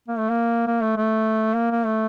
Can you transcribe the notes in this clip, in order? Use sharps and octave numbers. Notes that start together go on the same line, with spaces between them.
A#3
A3
A#3
A#3
A3
A3
A#3
A#3
A3